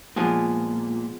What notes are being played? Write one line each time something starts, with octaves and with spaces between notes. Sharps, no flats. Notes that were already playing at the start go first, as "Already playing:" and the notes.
A#2 F3 G#3 B3